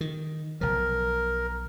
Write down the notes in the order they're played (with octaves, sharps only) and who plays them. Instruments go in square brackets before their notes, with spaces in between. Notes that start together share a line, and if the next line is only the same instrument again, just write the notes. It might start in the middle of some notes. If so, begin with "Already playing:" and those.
[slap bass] D#3
[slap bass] B1 F3 [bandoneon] A#4